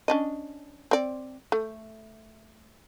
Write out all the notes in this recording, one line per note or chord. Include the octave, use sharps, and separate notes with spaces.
C#4 D4 D#5
C4 D5
A3